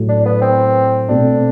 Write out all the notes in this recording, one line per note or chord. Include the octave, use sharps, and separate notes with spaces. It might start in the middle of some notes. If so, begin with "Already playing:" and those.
Already playing: A2 F#3 A3
D4
B3
C4
B2 A3 C4 D4